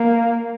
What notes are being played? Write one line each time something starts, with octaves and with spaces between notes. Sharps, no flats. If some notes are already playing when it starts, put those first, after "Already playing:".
Already playing: A#3